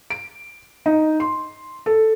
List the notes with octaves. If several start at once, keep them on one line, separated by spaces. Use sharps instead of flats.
D7
D#4
C6
A4